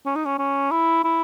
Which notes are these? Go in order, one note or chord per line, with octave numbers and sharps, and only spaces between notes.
C#4
D#4
C#4
C#4
E4
E4